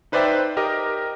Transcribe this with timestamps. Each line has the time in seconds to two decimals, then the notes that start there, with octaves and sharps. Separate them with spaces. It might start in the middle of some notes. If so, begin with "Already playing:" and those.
0.12 D#4 B4 C5 D5 E5 G5
0.57 G4 A#4 D#5